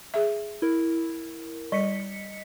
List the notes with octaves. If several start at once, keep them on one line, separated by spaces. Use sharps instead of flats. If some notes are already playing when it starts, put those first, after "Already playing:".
G#4 E5
E4 A#4
G3 D#5 B6 C#7